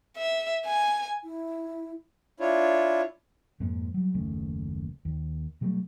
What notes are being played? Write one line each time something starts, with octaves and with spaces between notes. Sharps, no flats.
E5
G#5
E4
D4 E4 F4 C#5
F2 G#2 A#3
F#3 G3
F#1 D#2 C#3 A3
D#2
B2 F#3 G3 A3